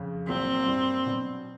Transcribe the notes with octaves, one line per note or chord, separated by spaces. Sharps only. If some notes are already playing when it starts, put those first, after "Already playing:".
Already playing: F2 C#3
C2 A#2 F#3 A#3 C4
G2 E3 G3 A#3 D4
B2 F#3 B3 D4